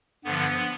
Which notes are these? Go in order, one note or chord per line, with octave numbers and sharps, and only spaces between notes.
G2 D3 F3 B3